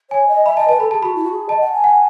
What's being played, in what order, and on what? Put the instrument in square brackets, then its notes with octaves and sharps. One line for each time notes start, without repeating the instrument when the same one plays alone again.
[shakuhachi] C#5 [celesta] G#5
[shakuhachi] D#5
[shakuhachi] E5 [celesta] B5
[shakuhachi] D#5 [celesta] A5
[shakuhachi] B4 [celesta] A5
[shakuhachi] A4 [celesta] B5
[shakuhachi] G#4 [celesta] A5
[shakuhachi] F#4 [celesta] B5
[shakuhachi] E4
F#4
G#4
[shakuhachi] D#5 [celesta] A5
[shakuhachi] F#5
G#5
[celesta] F#5